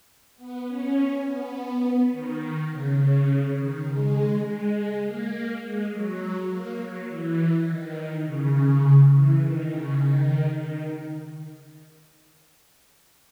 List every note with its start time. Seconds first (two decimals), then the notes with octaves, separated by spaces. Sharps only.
0.37 B3
0.66 C#4
1.24 B3
2.11 D#3
2.71 C#3
3.00 C#3
3.58 D#3
3.88 G#3
4.45 G#3
5.03 A#3
5.62 G#3
5.91 F#3
6.50 A#3
6.79 F#3
7.07 E3
7.66 D#3
8.24 C#3
9.12 E3
9.42 D#3
9.71 C#3
10.00 D#3
10.58 D#3